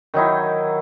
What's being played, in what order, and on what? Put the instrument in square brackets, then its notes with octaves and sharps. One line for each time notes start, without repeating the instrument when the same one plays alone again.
[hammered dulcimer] D#3 F#3 D#4 E4